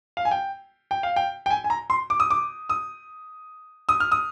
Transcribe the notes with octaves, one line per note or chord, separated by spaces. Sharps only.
F5
G#5
G5
G5
F5
G5
G5
G#5
G#5
A#5
C6
D6
D#6
D6
D#6
D#6
F6
D#6